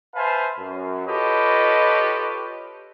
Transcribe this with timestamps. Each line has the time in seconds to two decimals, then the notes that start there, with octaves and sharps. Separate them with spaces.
0.15 B4 C5 E5 F5 G#5 A5
0.59 F#2
1.06 F4 G4 A4 B4 C#5 D#5